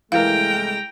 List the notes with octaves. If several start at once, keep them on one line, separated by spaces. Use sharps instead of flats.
C2 E3 G#3 A3 A#4 F5 G5 A#5